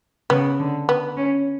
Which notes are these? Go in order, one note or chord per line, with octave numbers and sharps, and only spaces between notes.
C#3 B3
D3
B3
C#4